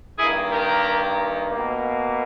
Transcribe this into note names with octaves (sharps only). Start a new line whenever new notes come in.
G2 D#3 A#3 E4 G#4
G4 A#4
B2 A#3